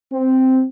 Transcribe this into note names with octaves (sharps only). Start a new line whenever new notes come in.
C4